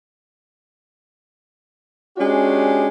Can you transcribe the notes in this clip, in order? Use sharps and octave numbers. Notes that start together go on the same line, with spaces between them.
G#3 C#4 D4 F#4 G4